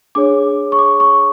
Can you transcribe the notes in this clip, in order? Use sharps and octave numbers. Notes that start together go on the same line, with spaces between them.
D4 G#4 C#5 D6
C#6
D6
C#6